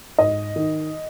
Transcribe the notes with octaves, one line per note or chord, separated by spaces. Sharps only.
G#2 D#5
D#3